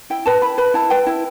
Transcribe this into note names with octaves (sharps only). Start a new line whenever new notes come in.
E4 G5
B4 A5
E4 B5
B4 B5
E4 A5
B4 G5
E4